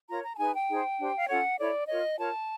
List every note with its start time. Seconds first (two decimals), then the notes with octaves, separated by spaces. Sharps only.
0.09 F4 A#4 C#5 A#5
0.24 A#5
0.34 A5
0.38 D#4 G#4 B4 G#5
0.54 G5
0.69 D#4 G#4 C5
0.98 D4 G4 C5
1.16 F5
1.28 C#4 F4 A4 C#5 F#5
1.58 E4 A4 C#5 D5
1.88 F4 A#4 C#5 D#5
2.18 F4 A#4 C#5 A5